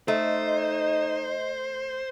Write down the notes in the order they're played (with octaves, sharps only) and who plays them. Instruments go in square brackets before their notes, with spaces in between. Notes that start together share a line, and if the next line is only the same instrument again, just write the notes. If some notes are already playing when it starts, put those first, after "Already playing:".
[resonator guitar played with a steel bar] A3 [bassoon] D#4 [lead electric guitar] C5 [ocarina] D#5